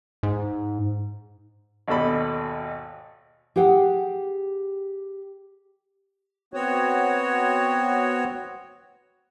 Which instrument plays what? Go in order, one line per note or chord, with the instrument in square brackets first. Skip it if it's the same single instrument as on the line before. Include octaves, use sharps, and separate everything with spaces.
[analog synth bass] G#2
[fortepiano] G#1 D#2 B2 A4 D5 B5
[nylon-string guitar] G4 G#4 F#5 G5
[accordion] B3 C4 F#4 C#5